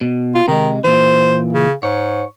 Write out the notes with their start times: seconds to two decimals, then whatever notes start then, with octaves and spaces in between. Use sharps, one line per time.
0.01 B2
0.35 F4
0.48 C3 D#3 G#3
0.84 A#2 E3 C5
1.53 C#3
1.83 G#2 C#5